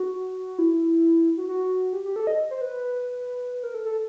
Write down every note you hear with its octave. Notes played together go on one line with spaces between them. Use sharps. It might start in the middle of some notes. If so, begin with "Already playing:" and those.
Already playing: F#4
E4
F#4
F#4
G4
G4
A4
D#5
C5
B4
A#4
A4
A4